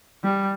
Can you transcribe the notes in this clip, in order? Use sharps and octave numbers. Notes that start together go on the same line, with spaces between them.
G3